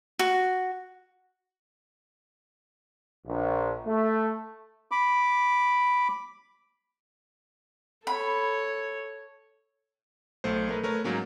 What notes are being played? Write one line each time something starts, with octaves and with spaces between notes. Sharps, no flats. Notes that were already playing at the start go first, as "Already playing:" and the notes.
F#4
A#1
A3
B5 D6
A4 C#5 B5
B1 A3 C5
A3 A#4 B4
A3 A#4 B4 C#5
G#2 F#3 A#3 C#4